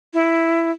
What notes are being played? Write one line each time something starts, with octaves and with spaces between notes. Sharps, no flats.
E4